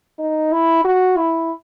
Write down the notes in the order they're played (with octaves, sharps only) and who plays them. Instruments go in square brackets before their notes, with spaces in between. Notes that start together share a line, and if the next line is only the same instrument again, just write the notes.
[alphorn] D#4
E4
F#4
E4